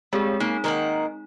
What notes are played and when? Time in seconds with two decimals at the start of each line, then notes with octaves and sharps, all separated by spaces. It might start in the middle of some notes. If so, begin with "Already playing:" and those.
0.13 G3 G#3 C4 G#4
0.40 A#3 D#4
0.64 D#3 A#3 F#5